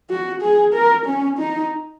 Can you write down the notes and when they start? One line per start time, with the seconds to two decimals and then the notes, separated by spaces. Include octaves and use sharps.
0.09 F#4
0.42 G#4
0.73 A#4
1.06 C#4
1.38 D#4